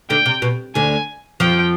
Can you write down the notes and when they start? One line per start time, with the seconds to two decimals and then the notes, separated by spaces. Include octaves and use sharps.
0.10 D2 D3 G5
0.26 C3
0.42 B2
0.75 D2 D3 G#5
1.40 F2 F3 G5